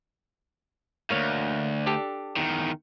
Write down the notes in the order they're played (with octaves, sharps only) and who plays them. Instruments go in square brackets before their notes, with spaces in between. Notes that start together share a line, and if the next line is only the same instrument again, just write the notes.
[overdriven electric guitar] D2 G#2 [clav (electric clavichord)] A#3 C#5 F5
[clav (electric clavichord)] D4 G4 A4
[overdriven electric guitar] E2 D#3